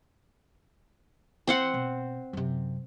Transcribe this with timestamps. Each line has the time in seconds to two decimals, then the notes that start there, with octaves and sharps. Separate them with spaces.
1.47 E3 C4 C5 F#5
1.74 B2
2.33 F#2 C3